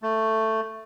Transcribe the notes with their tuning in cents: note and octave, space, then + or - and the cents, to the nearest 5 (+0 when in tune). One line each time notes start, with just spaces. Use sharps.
A3 +10